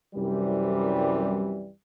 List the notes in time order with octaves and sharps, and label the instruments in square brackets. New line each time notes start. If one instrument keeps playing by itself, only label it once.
[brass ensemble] C2 F#2 C3 E3 G3